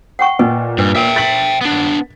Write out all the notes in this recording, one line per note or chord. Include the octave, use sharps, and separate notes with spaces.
F#5 G5 C#6
A#2 B4 D#5 G#5
G2 D4 B4
A#4 E5 G5
A6 B6 F#7
B3 D4